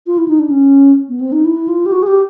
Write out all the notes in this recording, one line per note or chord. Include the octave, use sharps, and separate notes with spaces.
F4
E4
D#4
D4
C#4
B3
C4
D#4
E4
F4
G4
F#4
G#4
G4